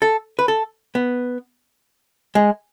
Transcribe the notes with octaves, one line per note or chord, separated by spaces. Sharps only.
A4
B4
A4
B3
G#3